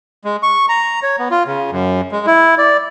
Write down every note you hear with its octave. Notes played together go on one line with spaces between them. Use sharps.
G#3
C#6
A#5
C#5
B3
F4
C#3
F#2
G#3
E4
D5